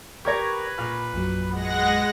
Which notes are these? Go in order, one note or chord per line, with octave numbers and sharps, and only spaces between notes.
G4 A#4 B4 C#5 C#6 G#6 A#6
A#2 F6
A#1 F#2 F#3
G#3 B3 F#5 A#6